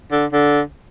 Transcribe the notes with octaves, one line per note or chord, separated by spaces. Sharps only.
D3
D3